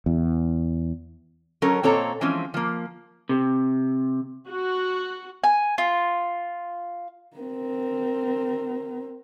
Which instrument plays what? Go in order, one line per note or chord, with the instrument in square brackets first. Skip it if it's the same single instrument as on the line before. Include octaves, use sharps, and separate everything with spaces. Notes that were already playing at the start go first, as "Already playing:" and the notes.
[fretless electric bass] E2
[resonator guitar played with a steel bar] F#3 C#4 A4 A#4
A#2 C4 A4 C#5 A#5
E3 F3 G#3 C4 C#4
F3 A#3
[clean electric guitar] C3
[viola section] F#4
[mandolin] G#5
F4
[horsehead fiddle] C4 A#4